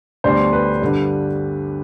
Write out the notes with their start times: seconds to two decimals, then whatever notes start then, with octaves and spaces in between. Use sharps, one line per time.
0.24 D2 D3 G3 B3 D4 C5
0.53 B4
0.81 G2 D3 G3